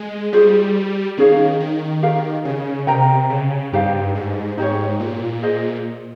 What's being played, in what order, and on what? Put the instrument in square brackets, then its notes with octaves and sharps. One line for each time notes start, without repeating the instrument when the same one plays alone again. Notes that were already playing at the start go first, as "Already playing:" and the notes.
Already playing: [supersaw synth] G#3
[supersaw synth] G3 [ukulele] F4 G#4 C5
[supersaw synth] D#3 [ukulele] C#4 G#4 C#5 F5
[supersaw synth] D#3
[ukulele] G4 A#4 F5
[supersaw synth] C#3
[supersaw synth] C3 [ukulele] A#4 D#5 G5 A#5
[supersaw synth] C#3
[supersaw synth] G2 [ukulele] D#4 G4 C5 F5
[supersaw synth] G#2
[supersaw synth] G#2 [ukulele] D#4 G4 C#5
[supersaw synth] A#2
[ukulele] G#4 C5 D#5